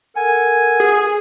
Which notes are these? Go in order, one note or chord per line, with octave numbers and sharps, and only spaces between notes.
A4 A#4 F#5 G#5
G#4